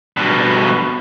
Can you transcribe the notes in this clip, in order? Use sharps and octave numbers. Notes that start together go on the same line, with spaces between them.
G2 B2